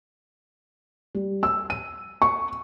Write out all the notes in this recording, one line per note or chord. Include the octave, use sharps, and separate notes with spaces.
G3
E6
D#7
C#6